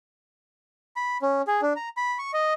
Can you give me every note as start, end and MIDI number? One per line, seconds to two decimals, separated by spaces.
0.96 1.18 83
1.22 1.42 61
1.47 1.61 68
1.62 1.73 62
1.76 1.89 82
1.97 2.18 83
2.19 2.31 85
2.33 2.54 75